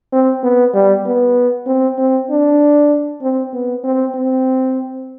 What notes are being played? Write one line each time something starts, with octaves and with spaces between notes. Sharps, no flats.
C4
B3
G3
B3
C4
C4
D4
C4
B3
C4
C4